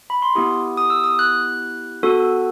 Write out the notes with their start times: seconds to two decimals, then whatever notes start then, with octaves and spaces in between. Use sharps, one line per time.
0.10 B5
0.22 C6
0.35 B3 E4 G4 D#6
0.77 D#6
0.90 E6
1.04 D#6
1.19 F#6
2.03 B3 F#4 A4